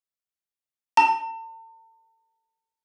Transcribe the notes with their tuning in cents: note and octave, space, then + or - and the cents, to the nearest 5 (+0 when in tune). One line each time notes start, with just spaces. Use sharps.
A5 +40